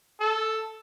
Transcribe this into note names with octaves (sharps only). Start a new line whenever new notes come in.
A4